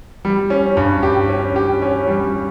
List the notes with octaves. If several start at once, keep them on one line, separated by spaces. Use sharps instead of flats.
G3
C#4
G2
G4
C#4
G4
C#4
G3